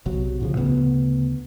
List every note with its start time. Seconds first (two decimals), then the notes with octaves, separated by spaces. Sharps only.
0.06 B1 C3 F#3
0.40 A2 C#3 F3
0.57 D2 C#3 B3